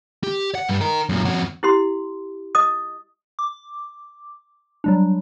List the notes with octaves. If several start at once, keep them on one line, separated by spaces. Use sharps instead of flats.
G4
F#5
G2 G3
D#4 A#4
F#2 A#2
F2 F#4
E4 G4 C6
D#5 D#6
D6
F#3 G3 D4